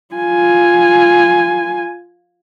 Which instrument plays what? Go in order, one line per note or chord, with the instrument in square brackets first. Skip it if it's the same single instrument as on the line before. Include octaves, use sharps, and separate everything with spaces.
[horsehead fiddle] F4 G#5